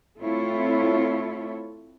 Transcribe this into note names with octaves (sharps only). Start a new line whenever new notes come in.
A3 C4 E4 F4 A4 C#5